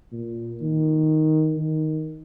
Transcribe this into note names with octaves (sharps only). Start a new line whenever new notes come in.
A#2
D#3
D#3